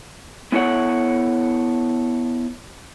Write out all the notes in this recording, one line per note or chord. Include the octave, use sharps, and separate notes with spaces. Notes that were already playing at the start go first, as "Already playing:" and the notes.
B3 E4 A4 C#5 F#5